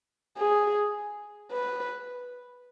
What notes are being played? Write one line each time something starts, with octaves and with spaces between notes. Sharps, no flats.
G#4
B4